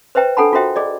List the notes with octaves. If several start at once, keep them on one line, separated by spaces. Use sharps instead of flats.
B4 C5 E5 G5 A#5
D4 A4 F#5 A5 B5
F4 F#4 A#4 C5 E5 G5
G#4 D5 D#5